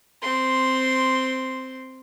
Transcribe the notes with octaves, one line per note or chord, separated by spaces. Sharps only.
C4 C6